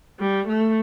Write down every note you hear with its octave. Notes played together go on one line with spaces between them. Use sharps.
G3
A3